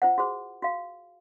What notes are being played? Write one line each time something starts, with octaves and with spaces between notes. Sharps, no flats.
F4 C5 F#5
F#4 G#4 C5
F#4 F5